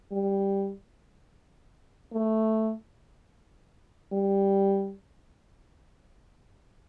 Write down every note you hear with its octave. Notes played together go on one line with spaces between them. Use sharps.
G3
A3
G3